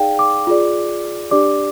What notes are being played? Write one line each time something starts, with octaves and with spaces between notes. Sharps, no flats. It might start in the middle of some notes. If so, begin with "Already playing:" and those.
Already playing: D#4 G#4 D5 F5 G5
D6
F4 G#4 D5
D4 G4 D5 D6